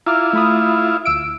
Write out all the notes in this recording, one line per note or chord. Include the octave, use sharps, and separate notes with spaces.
E4 F4 A#5 D6 F6
A3 B5 D#6
D2 E6 D7